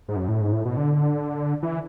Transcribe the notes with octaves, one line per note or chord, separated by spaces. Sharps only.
G#2
F#2
A2
G#2
A2
B2
D3
E3